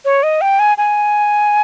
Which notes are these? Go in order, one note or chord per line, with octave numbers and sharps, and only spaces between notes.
C#5
D#5
G5
G#5
G#5